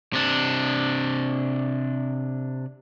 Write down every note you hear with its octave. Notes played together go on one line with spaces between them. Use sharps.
C3 D4